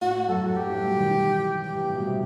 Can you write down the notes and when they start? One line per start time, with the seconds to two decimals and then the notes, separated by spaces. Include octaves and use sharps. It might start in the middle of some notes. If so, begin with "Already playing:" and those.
0.01 A2 F#4
0.28 F#2 A4
0.42 F#2 F#4
0.56 G2 G4
0.70 A2
0.83 B2
0.96 D#3
1.11 E3
1.64 G4
1.73 G2
1.84 A2
1.95 B2
2.07 C3